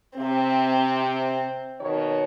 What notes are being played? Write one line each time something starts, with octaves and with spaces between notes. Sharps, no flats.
C3 C4
B2 D#3 C#5